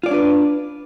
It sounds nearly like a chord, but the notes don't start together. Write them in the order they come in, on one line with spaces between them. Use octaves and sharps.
F4 D5 C#5 D4 B4